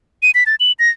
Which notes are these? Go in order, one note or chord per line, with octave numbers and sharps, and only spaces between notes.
D#7
B6
A6
F#7
A#6